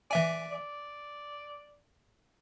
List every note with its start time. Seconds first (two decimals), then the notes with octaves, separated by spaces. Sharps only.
0.11 E3 D5 E5 G#5
0.53 D5